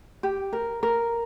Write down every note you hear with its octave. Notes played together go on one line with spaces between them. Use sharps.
G4
A#4
A#4